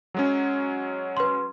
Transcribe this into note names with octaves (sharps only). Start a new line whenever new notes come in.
F#3 G#3 C#4
B4 C6